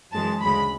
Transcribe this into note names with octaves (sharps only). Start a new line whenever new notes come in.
F#2 E3 G#3 A5
D2 C#3 G#3 B5